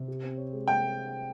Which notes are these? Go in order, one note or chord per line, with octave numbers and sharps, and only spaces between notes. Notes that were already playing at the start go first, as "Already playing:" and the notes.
Already playing: C3
G4
C4
C#5
G#3
G#3 G5